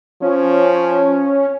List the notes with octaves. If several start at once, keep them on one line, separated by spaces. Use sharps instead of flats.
F3 C#4